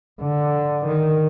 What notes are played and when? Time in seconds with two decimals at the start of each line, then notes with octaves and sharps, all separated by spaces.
0.21 D3
0.87 D#3